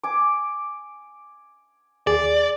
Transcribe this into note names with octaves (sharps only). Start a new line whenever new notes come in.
G#5 D6
D#2 G#4 D5